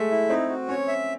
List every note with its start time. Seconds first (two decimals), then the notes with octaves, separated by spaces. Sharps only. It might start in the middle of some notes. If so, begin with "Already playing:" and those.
Already playing: G#3 A3 E5
0.11 E4
0.30 C4 D#4
0.49 F#4
0.68 C#4 C#5
0.88 E5